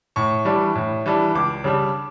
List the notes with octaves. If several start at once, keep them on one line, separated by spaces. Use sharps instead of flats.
A2 C#6
E3 G3 D4
A2
E3 G3 D4
C#2 D6
C#3 G3 D4